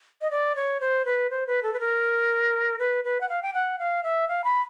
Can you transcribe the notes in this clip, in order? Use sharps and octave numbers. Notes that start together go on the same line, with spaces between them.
D#5
D5
C#5
C5
B4
C5
B4
A4
B4
A#4
B4
B4
F#5
F5
G5
F#5
F5
E5
F5
B5